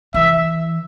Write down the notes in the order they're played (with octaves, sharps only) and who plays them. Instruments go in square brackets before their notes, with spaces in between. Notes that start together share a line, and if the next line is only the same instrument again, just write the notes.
[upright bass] E3 [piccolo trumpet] E5